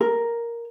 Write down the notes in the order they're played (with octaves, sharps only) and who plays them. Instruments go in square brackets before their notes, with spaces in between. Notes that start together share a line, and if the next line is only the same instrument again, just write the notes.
[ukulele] A#4